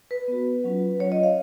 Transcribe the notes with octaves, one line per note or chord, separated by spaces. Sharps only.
B4
B3 F#4
F#3 C#4 F4
F#3 C#4 F4 C#5
D#5
F5